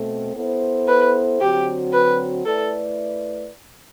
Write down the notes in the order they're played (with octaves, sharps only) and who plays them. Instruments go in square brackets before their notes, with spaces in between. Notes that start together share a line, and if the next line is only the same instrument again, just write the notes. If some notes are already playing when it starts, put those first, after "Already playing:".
Already playing: [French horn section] B2 A3 C4
B3 E4 A4 C5
[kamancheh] B4
[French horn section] D3 F#3 C4 F#4 [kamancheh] G4
[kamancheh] B4
[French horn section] A3 E4 B4 D5 [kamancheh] A4